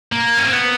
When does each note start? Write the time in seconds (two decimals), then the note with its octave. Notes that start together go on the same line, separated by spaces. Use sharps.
0.12 A#3
0.38 C#4
0.46 C4
0.53 B3